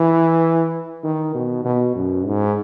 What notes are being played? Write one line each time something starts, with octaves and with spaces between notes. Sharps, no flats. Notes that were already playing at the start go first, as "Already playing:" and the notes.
Already playing: E3
D#3
B2
B2
F#2
G#2